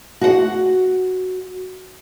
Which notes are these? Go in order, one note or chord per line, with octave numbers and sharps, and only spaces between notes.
F#4 F#5